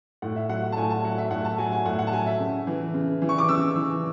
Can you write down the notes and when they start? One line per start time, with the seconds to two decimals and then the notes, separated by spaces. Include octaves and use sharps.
0.22 A2 F#5
0.36 E5
0.49 F#3 F#5
0.63 F#5
0.72 A5
0.77 A2 G#5
0.90 A5
1.04 F#3 F#5
1.18 E5
1.31 A2 F#5
1.45 A5
1.58 F#3 G#5
1.72 G#5
1.86 A2 F#5
1.99 F#5
2.07 A5
2.13 F#3 G#5
2.26 E5
2.39 C#3
2.67 E3
2.94 C#3
3.22 E3
3.29 C#6
3.38 D6
3.49 C#3 E6
3.76 E3